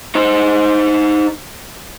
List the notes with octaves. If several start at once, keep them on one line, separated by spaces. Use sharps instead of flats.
D#4 C5